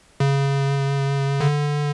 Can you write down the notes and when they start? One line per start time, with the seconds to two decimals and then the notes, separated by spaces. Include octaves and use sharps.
0.20 C#3
1.40 D3